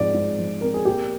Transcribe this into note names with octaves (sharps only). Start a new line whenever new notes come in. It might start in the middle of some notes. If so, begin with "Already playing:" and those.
Already playing: G#2 F3 C4 D5
G#2
F3
C4 A#4
G#4
A#3 G4